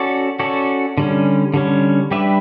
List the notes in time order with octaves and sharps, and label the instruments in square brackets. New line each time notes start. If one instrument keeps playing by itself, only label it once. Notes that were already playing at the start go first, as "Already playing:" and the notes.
Already playing: [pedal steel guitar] C#4 F#4 A4 D5
C#4 F#4 A4 D5
D3 G3 C#4
D3 G3 C#4
G3 D4 G4 B4 E5